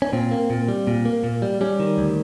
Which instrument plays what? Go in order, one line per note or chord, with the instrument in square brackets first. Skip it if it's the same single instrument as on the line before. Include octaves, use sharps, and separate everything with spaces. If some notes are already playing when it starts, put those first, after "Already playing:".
[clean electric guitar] C#4
A#2 C4
A#3
A#2
G3
A#2
A#3
A#2
G3
G3 C#4
D#3
D2